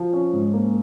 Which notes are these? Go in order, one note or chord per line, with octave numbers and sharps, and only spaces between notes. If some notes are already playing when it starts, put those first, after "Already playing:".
Already playing: F3
C#4
G#2
A#3